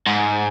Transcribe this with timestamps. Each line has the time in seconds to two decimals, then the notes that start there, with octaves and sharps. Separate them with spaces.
0.07 G#2